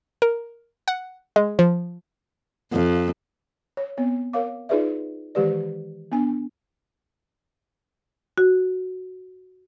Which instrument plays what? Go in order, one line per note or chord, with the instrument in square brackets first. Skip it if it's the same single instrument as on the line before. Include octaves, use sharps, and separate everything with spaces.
[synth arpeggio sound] A#4
F#5
G#3
F3
[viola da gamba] F2
[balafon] C#5
B3 C4 C#5
A#4 C#5 F5 D6
D#4 F4 G#4 B4 D5 E5
D#3 E3 G#3 G4 B4 D5
B3 D4 G#5
[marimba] F#4